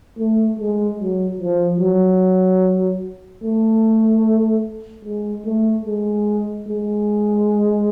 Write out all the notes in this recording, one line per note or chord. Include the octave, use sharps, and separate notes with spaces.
A3
G#3
F#3
F3
F#3
A3
G#3
A3
G#3
G#3